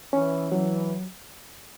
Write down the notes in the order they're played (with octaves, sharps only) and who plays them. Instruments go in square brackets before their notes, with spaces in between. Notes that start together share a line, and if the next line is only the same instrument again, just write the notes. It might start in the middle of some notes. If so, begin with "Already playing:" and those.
[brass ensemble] E3 [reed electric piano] C#4
[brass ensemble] E3 [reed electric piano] F#3